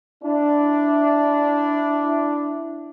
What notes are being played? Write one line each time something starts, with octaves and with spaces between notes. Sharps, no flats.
D4 E4